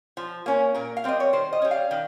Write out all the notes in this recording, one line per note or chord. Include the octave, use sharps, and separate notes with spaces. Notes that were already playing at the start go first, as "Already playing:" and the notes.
F3
A#3 C#4
A#2 A#4
F5
G3 C4 D#5
C#5
D#3 C5
D#5
G3 C#4
F5
D#3